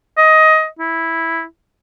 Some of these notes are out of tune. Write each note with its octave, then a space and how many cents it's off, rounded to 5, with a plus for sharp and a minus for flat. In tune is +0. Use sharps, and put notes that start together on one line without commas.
D#5 +15
E4 -5